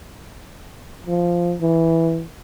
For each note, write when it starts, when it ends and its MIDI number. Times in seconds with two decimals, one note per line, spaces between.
1.06 1.55 53
1.62 2.24 52